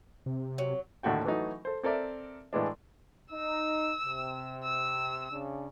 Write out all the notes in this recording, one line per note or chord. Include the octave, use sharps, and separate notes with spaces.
C3
F#3
D#2 A2 D3 F#4 G5
E3 F#3 A3 D#4
A4 C5
C4 A4 A#4 D5 E5
A2 E3 G#3 D4
D#4 E6
C3
E6
C#3 D4